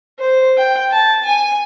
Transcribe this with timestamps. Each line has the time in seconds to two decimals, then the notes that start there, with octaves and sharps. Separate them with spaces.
0.19 C5
0.57 G5
0.91 A5
1.25 G#5